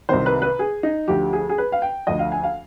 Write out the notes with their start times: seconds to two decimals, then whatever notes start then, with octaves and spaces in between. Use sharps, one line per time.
0.09 C2 C3 D#3 C5
0.26 B4
0.42 B4
0.59 G#4
0.83 D#4
1.08 D2 D3 F3 G4
1.33 G#4
1.49 G#4
1.58 B4
1.72 F5
1.82 G5
2.07 D2 D3 F3 D#5
2.19 F5
2.32 G#5
2.43 F5